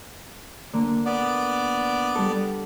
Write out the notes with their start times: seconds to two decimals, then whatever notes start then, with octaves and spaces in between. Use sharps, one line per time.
0.73 D3 A#3
1.06 B3 D5
2.15 G3 A4